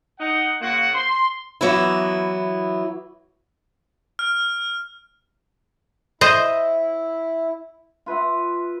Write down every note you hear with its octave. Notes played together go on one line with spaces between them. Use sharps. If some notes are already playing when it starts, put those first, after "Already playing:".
D#4 F#5
C#3 A#3 F4 F#4 F#5
C6
E3 F#3 B3 E4
F6
E4 C5 D#5
F4 B4 E5 F#5